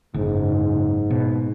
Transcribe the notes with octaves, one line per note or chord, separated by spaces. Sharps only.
F#1 G#2
B2